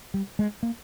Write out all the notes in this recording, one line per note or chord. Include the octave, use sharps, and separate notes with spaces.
G3
G#3
A#3